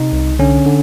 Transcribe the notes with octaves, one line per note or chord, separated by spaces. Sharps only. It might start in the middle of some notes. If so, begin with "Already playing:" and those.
Already playing: C3 D#4
C2
D3 C#4
D3